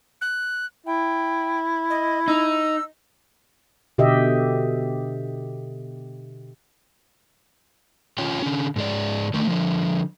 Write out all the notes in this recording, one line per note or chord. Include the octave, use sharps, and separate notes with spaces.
F#6
E4 G5
D#5
D#4 E6
B2 D3 G4 D#5 E5
C#4 F4 C#5 G5
D3 C#4
G#2 G#3 D5
D3 D#3 A3
D3 F3